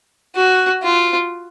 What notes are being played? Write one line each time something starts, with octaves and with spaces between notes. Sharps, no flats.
F#4
F4